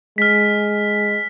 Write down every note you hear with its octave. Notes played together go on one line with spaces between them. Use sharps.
G#3 F6 B6